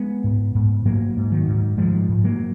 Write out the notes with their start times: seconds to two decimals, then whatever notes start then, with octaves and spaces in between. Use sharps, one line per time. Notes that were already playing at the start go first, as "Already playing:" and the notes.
Already playing: G#3 B3
0.24 G#2
0.55 G#2
0.85 G#2 F#3 A#3
1.17 G#2
1.32 D#3 F#3
1.48 G#2
1.77 G#2 F3 G#3
2.09 G#2
2.24 F#3 A#3